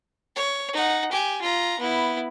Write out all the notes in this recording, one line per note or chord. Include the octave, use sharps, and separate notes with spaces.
C#5
D#4 F#5
G4 G#5
F4 A#5
B3 E4